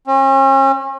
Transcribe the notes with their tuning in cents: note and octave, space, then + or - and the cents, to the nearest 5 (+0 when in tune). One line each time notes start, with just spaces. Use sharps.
C#4 -40